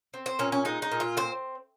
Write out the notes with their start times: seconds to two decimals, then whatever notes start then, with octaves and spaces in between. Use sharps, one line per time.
0.14 C4
0.26 C5
0.39 A#2 C#4
0.52 C#4
0.65 G#3 D#4
0.82 D#4
0.92 A#2
1.00 F4
1.17 C4 C5